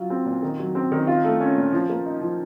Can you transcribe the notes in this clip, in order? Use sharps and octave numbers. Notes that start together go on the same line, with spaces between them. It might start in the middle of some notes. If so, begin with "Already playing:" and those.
Already playing: F#3 F4
C4
A#2
D#3
F#3
C4
D#3
F4
A3
C#4
A#2
F3
A#3
D#4
F3